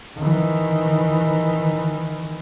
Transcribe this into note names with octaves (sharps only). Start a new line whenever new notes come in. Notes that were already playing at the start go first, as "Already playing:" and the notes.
D#3 E3